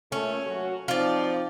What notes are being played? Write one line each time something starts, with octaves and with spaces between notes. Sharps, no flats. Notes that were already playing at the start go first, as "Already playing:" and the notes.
A#2 A3 C#4
F#3 F#4
F3 C4 D#4 F4 D5